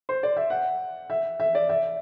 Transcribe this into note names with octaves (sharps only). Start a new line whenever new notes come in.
C5
D5
E5
F#5
E5
E5
D5
E5